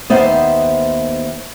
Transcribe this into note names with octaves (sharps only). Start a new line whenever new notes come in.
D#2 B3 C5 E5